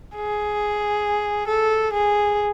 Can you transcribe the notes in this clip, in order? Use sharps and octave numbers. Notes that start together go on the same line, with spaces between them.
G#4
A4
G#4